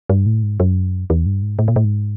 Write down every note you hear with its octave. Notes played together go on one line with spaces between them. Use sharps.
G2
A2
G#2
F#2
E2
G2
G#2
A2
A#2
A2
G#2